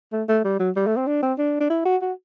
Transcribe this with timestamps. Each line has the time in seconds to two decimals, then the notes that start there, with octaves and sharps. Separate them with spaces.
0.13 A3
0.29 A3
0.44 G3
0.60 F#3
0.76 G3
0.86 A3
0.96 C4
1.07 D4
1.22 C4
1.38 D4
1.60 D4
1.70 E4
1.85 F#4
2.01 F#4